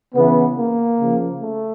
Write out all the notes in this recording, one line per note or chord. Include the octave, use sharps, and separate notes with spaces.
C#3 E3 B3
A#3
C#3 F3
A3